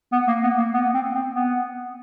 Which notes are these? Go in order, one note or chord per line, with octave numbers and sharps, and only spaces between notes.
B3
A#3
B3
A#3
B3
C4
C4
B3